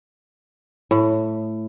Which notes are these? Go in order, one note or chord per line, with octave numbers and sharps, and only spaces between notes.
A2